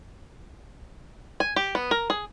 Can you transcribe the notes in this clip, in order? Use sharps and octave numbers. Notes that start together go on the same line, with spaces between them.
G#5
G4
B3
A#4
G#4